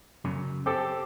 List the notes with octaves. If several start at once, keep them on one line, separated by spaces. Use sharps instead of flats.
F#2 C#3 F#3
C4 G4 A4